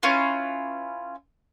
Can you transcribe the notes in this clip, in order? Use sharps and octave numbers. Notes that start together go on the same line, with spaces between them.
C#4 E4 F4 B4